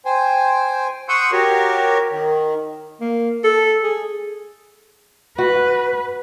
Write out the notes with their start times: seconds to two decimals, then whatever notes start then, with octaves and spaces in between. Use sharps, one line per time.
0.05 C5 G5 G#5
1.09 F#5 C6 C#6 D#6 E6 G6
1.32 F#4 G4 A#4 C#5
2.11 D#3
3.00 A#3
3.44 A4
3.83 G#4
5.38 F#4 B4